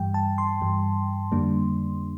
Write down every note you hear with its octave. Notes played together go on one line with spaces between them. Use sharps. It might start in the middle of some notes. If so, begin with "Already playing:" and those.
Already playing: G2 E3 G3 G5
A5
C6
G2 E3 G3
F2 D3 G3 A#3 D4